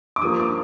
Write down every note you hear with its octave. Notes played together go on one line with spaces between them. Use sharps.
D6
G2 F3 A#3 D#6
D6